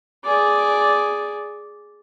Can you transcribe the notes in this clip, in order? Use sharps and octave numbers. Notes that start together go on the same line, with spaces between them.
G#4 D5